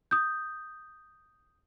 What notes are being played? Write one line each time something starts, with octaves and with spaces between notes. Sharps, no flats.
D#6 G6